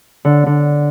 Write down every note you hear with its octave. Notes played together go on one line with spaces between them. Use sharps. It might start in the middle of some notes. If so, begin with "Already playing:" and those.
D3
D3